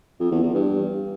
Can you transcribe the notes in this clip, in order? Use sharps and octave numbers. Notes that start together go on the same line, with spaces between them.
F2
E2
E2
G2